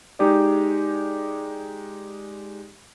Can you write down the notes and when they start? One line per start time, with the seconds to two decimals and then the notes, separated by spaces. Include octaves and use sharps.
0.19 G#3 D#4 G4 G#4 D5